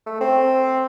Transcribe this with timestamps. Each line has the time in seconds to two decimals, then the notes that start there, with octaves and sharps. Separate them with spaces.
0.07 A3
0.21 C4